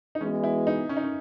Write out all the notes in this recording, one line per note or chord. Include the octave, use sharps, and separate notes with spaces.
D#4
E3 G#3 B3 C#4 F#4
E4
D#4
C#4
D#4
C#4